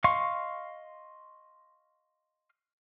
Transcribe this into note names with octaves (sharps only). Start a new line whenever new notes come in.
D#5 F5 C6 C#6